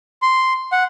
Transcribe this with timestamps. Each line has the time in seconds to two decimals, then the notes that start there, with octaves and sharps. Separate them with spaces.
0.22 C6
0.72 F#5